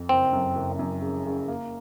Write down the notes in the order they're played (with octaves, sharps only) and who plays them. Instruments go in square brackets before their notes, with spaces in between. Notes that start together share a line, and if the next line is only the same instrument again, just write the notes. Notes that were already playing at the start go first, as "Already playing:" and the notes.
Already playing: [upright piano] F2
[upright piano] F#1 [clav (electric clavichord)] C4
[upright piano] F#2
F#1
F#2
C#3
C#3
A#3